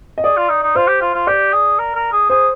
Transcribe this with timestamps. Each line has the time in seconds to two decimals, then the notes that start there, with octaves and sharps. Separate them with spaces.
0.18 D#5
0.24 G#4 D5
0.37 F4
0.49 D#4
0.63 D#4
0.75 F4 C5
0.88 G4
1.01 F4
1.15 F4
1.27 G4 D5
1.53 G#4
1.79 A#4
1.95 A#4
2.12 G#4
2.30 G#4 C5